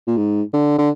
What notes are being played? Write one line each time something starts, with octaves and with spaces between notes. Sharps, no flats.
A#2
G#2
D3
D3